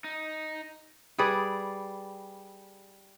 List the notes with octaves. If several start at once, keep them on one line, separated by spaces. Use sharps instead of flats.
D#4
G3 G#4 B4 D5